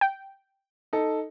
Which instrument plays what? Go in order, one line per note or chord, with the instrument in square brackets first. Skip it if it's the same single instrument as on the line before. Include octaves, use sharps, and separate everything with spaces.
[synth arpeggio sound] G5
[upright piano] D#4 A4